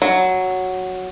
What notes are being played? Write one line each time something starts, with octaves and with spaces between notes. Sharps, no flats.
F#3